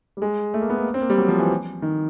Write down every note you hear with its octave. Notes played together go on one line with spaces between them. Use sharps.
G3
G#3
A3
A#3
B3
A#3
C4
A#3
G3
F#3
F3
E3
D#3